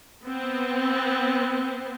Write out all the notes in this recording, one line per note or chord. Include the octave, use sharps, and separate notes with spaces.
B3 C4